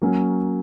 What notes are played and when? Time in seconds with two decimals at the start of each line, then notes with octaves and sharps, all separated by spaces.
0.02 F#3 A#3 C#4